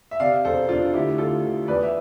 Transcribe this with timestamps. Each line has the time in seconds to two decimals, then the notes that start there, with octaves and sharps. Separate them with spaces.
0.11 E5
0.20 C3 D5 F5
0.44 E1 A4 C5
0.69 E1 D4 F4
0.94 D2 E4 G4
1.18 D2 F4 A4
1.43 D2
1.68 E2 B4 D5
1.83 E5